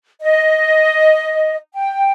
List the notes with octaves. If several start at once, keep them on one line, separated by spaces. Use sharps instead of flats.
D#5
G5